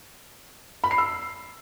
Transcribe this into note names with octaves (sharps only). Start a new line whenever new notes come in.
B5
C7
E6